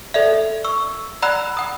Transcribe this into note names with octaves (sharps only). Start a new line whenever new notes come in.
A4 D5 E5
C#6 E6
D5 F#5 A#5 B5 E6 F#6
F#5 D#6